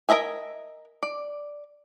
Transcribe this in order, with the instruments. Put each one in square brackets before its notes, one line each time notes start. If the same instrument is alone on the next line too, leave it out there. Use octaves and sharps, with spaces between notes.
[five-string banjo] A#4 B4 D#5 E5 G#5
D5